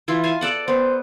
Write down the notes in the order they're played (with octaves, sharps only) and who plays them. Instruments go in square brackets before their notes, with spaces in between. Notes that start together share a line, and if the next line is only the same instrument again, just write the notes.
[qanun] E3 E4 F4
F5 G#5 A5
A4 D5 F#5
[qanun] B3 [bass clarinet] C5